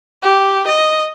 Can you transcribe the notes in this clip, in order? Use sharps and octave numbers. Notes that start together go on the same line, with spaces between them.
G4
D#5